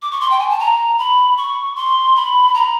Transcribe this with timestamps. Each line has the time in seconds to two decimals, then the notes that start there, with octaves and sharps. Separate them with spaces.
0.02 D6
0.11 C#6
0.21 C6
0.30 G5
0.40 G#5
0.50 A5
0.59 A#5
0.99 B5
1.37 C#6
1.76 C6
2.16 B5
2.54 A#5